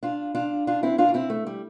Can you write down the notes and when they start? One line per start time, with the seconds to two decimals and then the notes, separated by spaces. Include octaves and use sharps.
0.03 D4 F4
0.35 D4 F4
0.67 D4 F4
0.83 C4 E4
0.98 D4 F4
1.09 D4
1.14 C4 E4
1.30 A3
1.47 G3